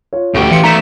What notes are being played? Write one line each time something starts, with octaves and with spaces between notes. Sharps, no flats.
F4 C#5
D2 A2 G4 C#6
E3 F5 C6 C#7
D#3 A3 A#5 B6 E7